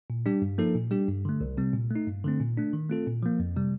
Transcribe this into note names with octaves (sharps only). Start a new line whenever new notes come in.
A#2
G3 D4 G4
G2
F3 A#3 D#4 A4
A#2
G3 D4 G4
G2
D3 A3
C2
C3 G3 C4
A#2
A3
D#4
G2
D3 A3 C4
A#2
A3 D4
D#3
A3 C4 F4 A4
A#2
F3 A#3
F2
C3 G3